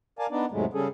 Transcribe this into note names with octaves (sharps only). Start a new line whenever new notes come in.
A#4 D5 F5 G#5 A5
B3 D4 D#4 D5
E2 G#2 C3 F#3 G#3 A3
C#3 G3 C#4 G#4 A4